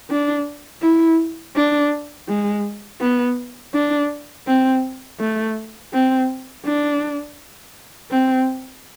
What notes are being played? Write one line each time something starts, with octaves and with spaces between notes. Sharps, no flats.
D4
E4
D4
G#3
B3
D4
C4
A3
C4
D4
C4